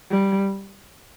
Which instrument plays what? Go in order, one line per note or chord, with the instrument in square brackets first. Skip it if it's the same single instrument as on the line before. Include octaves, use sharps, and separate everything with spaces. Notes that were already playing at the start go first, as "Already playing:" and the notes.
[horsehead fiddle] G3